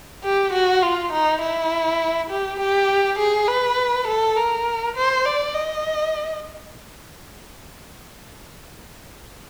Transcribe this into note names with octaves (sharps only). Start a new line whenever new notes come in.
G4
F#4
F4
D#4
E4
G4
G4
G#4
B4
A4
A#4
C5
D5
D#5